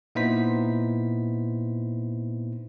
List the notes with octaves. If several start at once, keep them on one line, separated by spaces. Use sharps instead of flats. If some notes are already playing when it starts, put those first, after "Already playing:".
A#2 B3 D#4 E4 C5 B6